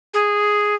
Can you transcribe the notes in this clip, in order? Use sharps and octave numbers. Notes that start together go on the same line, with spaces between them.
G#4